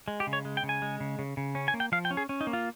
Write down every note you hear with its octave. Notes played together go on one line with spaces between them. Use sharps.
G#3
G4
C#3
C#5
G#3
G5
C#3
G#5
G#3
C#3
C#3
C#3
C#4
G#5
A#3
G5
F3 F5
G5
C#4
G#4
C#4
D#4
A#3
F4